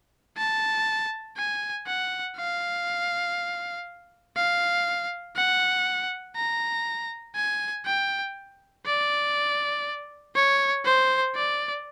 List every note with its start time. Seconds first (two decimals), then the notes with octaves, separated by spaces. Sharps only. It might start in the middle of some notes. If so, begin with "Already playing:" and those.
0.37 A5
1.37 G#5
1.87 F#5
2.37 F5
4.37 F5
5.36 F#5
6.36 A#5
7.36 G#5
7.86 G5
8.86 D5
10.35 C#5
10.85 C5
11.35 D5